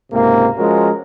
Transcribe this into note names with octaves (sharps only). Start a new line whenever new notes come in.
C#2 G#2 C3 A#3
F3 G#3 C#4 F#4 A#4